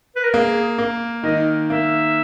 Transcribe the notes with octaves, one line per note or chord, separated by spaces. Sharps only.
B4
A#4
A#3 G#4
A#3
D#3 D#5
A#3 E5